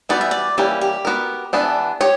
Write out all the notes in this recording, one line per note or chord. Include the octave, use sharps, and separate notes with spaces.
E3 G3 B3 F#4 D5
E5
D5
E3 G3 A#3 C#4 G4
G4
B3 F#4 A#4
E3 B3 D4
G4 C#5